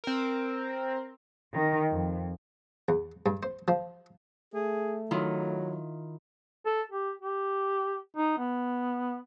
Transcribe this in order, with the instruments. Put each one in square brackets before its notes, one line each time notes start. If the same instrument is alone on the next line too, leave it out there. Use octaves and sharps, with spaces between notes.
[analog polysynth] C4 A#4
[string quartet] D#3
F2
[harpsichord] E2
G2
C5
F3
[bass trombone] A3 [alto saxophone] G#4
[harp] D#3 E4 F4 [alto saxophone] F#3
[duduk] A4
G4
G4
D#4
B3